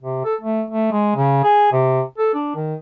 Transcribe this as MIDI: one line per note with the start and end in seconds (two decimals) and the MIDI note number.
0.02 0.21 48
0.25 0.35 69
0.41 0.63 57
0.70 0.89 57
0.92 1.15 56
1.16 1.39 49
1.44 1.72 68
1.72 2.01 48
2.18 2.33 69
2.34 2.51 62
2.55 2.75 51